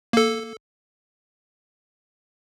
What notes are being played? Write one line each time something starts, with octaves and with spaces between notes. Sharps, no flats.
A#3 A4